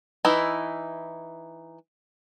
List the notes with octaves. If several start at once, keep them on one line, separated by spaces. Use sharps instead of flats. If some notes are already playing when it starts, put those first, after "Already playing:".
E3 D#4 E4